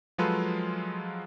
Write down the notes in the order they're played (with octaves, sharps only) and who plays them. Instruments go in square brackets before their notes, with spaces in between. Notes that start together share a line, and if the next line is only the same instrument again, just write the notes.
[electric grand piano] F3 F#3 G#3 F4 A4 B4